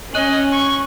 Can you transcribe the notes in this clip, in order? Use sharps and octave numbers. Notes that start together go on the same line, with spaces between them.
C#4 D#5 F#6 D#7 F#7
C#6